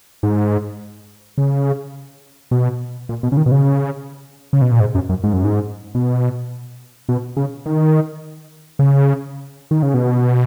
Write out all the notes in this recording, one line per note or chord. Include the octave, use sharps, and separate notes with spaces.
G#2
C#3
B2
A#2
B2
C#3
D#3
B2
C#3
C#3
B2
A#2
G#2
F#2
F#2
G#2
F#2
G#2
B2
B2
C#3
D#3
C#3
D#3
C#3
B2